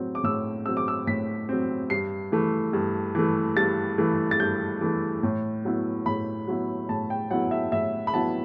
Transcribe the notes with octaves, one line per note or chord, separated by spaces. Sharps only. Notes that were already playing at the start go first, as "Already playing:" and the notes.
Already playing: A2 F#3 C4
D6
A2 E6
F#3 C4 E6
D6
E6
A2 B6
F#3 C4
G2 C7
E3 A3
G2
E3 A3
G2 A6
E3 A3
A6
G2 G6
E3 A3
A2
F#3 B3 E4
A2 B5
F#3 B3 E4
A2 A5
G5
F#3 B3 E4 F#5
E5
A2 E5
B5
F#3 B3 E4 A5